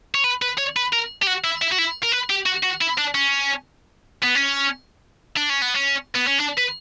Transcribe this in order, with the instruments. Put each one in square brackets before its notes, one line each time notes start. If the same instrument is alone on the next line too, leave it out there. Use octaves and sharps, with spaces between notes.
[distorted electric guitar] C#5
B4
B4
C#5
B4
A#4
G4
F#4
E4
E4
F#4
E4
A#4
B4
G4
F#4
F#4
E4
D4
C#4
B3
C#4
D4
C#4
B3
C#4
B3
C#4
D4
B4